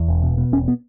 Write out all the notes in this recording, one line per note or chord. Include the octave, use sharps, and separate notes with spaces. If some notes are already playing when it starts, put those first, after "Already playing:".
Already playing: E2
E1
B2
B2
E1 C#4
B3